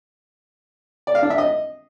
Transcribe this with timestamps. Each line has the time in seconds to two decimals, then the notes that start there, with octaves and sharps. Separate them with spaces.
1.07 D5
1.15 F5
1.23 D4
1.30 E5
1.38 D#5